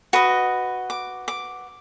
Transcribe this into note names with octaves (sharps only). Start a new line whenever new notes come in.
F#4 B4 D#5
D6
D6